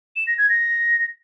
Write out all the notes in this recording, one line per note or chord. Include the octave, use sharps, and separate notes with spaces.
E7
A#6
G#6
A#6